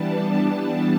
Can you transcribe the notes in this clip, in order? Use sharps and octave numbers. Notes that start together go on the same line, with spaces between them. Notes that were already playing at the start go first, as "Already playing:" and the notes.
Already playing: E3 G3 B3 D4 A5